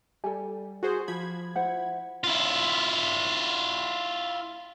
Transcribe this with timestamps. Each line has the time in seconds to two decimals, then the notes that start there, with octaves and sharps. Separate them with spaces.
0.24 G3 A4 G#5
0.83 F#4 G#4 C5
1.08 F3 B5 G#6
1.56 E4 C5 F#5
2.24 E4 F4